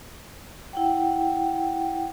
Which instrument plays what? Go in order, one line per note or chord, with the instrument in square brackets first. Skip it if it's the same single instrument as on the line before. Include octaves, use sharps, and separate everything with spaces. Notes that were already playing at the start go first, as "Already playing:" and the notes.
[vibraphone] E4 F#5 G5